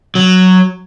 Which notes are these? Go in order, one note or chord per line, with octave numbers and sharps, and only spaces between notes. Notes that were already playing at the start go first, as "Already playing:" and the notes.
F#3